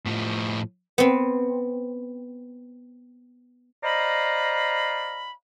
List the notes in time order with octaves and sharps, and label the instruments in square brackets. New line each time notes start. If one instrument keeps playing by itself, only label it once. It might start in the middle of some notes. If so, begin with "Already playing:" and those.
[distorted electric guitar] A2 F3
[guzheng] B3 C4
[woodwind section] C5 D5 D#5 F5 A#5 B5